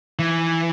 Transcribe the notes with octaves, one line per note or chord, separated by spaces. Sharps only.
E3